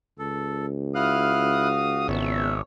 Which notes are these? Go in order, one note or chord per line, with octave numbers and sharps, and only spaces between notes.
C#2 A4
E4 F#4 F5 D#6 F6 F#6
G#1 E2 B3 C#5 E5